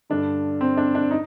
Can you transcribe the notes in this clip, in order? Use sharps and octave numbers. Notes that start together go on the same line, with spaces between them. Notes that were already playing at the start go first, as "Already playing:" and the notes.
G2 D3 D4
C4
D4
D4
D#4